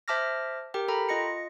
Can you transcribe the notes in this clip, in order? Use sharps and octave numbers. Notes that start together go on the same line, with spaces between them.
C5 E5 A5 D6 F6 A#6
G4 A#4 G5
A4 G5 A#5 B5
F4 D#5 A#6 C#7